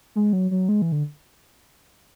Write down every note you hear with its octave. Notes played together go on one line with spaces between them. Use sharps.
G#3
F#3
F#3
G#3
E3
D3